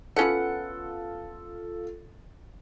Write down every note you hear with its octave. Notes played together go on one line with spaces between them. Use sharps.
B3 C#4 F4 A4 F#5